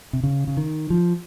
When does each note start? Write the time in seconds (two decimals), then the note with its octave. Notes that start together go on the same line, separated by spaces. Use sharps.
0.13 C3
0.23 C#3
0.47 C#3
0.57 D#3
0.90 F3